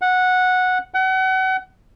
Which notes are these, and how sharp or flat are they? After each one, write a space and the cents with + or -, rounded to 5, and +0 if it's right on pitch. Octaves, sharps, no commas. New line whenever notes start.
F#5 -10
F#5 +35